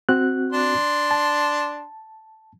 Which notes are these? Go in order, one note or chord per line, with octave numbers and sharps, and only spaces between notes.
C4 F#4 F#6
D4 C6
A5